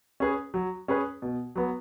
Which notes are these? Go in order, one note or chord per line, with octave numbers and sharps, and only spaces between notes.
C#4 G#4 B4
F#3
C#4 G#4 B4
B2
F#3 B3